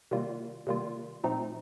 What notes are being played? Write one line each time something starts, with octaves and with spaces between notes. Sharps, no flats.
C3 D#3 G3 A#3 F4
C3 D#3 G3 A#3 F4
A#2 F3 A3 C4 D#4